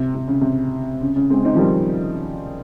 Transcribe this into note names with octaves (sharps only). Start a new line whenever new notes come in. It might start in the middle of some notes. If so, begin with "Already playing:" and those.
Already playing: C3
C3
C#3
C3
C#3
C#3
G#3 C4
C4 D#4
F3
D#3 G3